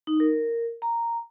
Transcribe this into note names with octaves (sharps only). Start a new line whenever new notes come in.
D#4
A#4
A#5